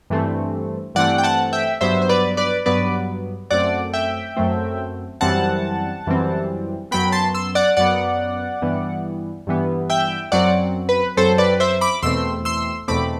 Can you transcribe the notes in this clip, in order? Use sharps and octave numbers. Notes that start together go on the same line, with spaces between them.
G2 E3 A3 C4
G2 E3 A3 C4 D5 F#5
G5
F#5 A5
E5 G5
G2 F#3 B3 C5 E5
C5
B4 D5
B4 D5
G2 F#3 B3 B4 D5
F#2 F#3 A3 C4 D5 F#5
E5 G5
F#2 F#3 A3 C4
F#2 E3 G3 C4 F#5 A5
F#2 E3 G3 C4
F#2 F#3 B3 G5 B5
A5 C6
C6 E6
D5 F#5
F#2 F#3 B3 D5 F#5
G2 E3 G3 B3
G2 E3 G3 B3
E5 G5
F#2 F#3 C4 D5 F#5
B4
F#2 F#3 C4 A4 C5
B4 D5
C5 E5
B5 D6
E2 B2 A3 C4 C6 E6
C6 E6
E2 B2 A3 C4 B5 D6